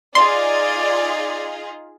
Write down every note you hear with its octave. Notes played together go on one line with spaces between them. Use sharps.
D#4 F4 G#4 D5 C6